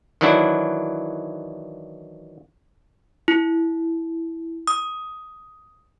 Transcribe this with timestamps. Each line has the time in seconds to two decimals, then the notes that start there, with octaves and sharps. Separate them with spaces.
0.21 D#3 E3 F#3 D4 E4
3.28 E4
4.67 D#6